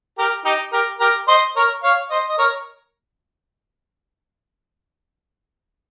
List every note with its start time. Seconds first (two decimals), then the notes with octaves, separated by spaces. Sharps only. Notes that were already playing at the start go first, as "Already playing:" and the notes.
0.18 G4 A#4
0.45 D#4 G4
0.73 G4 A#4
1.00 G4 A#4
1.28 C5 D#5
1.56 A#4 C#5
1.83 C#5 F5
2.10 C5 D#5
2.29 D#5
2.38 A#4 C#5